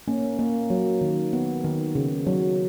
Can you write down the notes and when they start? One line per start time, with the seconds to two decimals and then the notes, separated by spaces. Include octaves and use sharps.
0.08 A#3 C#4
0.39 A#3
0.70 F#3
1.01 D#3
1.33 B3
1.64 D#3
1.95 C#3
2.27 F#3